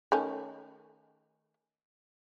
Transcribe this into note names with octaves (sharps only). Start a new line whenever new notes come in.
D#3 A3 C#4